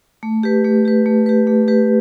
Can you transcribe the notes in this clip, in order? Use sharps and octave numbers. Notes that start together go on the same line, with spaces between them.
A3
G4 B4
A3
G4 B4
A3
G4 B4
A3
G4 B4